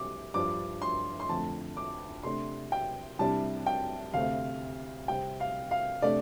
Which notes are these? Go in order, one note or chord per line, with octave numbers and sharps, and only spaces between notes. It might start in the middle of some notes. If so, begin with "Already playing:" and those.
Already playing: C2 C3 G3 C4 D6
G2 F3 D4 D6
C6
C6
F2 D3 A3 A5
D6
C3 A3 D4 C6
G5
C2 C3 G3 D4 A5
G5
D2 C3 A3 C4 F5
C3 G3 C4 G5
F5
F5
C3 A3 D4 D5